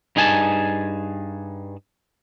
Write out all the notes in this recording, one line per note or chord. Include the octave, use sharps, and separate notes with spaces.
G2 D#4 G#4 G#5 A5